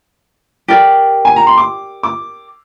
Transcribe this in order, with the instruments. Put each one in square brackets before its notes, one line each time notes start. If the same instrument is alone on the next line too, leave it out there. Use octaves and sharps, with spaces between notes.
[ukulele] G4 A#4 D5
[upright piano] G#5
A#5
C6
D6
D6